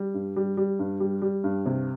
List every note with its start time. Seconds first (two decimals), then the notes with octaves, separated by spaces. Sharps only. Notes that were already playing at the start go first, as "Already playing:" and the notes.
Already playing: G3
0.14 G2
0.36 G3
0.57 G3
0.79 G2
1.00 G3
1.22 G3
1.44 G2
1.66 C3